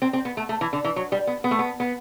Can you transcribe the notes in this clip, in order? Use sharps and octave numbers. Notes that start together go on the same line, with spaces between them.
C4
C4
B3
A3
A3
E3
D3
E3
F#3
G3
B3
B3
A3
B3
B3